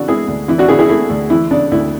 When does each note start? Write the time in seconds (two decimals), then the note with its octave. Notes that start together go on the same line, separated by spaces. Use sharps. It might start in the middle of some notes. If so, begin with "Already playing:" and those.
Already playing: C#3 E3 D4 F#4
0.08 G#3 E4 G#4
0.28 D2
0.48 E3 E4
0.58 D4 F#4
0.69 C#3 E4 G#4
0.79 E4 G#4
0.89 A3 E4
1.10 D2
1.30 E3 E4
1.51 C#3 D4
1.71 D2 E4